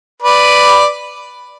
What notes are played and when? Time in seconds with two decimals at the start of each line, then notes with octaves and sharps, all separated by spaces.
0.22 B4 D5